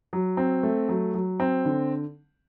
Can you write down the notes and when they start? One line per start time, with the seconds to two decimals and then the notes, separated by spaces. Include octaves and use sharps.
0.13 F#3
0.37 C4
0.63 A3
0.89 F#3
1.14 F#3
1.40 C4
1.65 D3